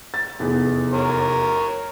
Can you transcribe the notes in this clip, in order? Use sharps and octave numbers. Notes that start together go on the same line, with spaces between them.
A6
F1 E2 G#4
A#4 C#5